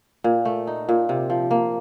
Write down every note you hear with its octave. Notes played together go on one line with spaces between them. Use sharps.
A#2
A3
D#4
A#2
C3
F3
A#3